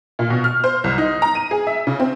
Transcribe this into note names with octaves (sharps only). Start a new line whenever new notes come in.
A#2
B2
F6
C5
C2
D#4
A#5
D#7
G#4
E5
C#3
C4